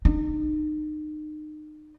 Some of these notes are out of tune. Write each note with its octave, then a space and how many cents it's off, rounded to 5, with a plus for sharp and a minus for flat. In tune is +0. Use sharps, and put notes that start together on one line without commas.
D#4 -35